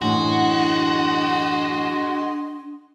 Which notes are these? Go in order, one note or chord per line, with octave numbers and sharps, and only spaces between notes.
F#2 A2 E3 D4 F#4 D#5 C6